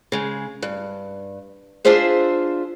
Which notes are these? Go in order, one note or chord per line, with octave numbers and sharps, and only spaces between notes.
C#3 G#3
G2
D4 F4 G#4 C5 E5